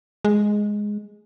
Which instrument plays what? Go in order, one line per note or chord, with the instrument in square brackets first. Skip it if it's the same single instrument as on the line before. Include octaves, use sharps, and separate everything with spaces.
[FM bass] G#3